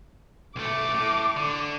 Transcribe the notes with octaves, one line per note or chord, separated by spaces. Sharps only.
B1 A3 D6
A2
D3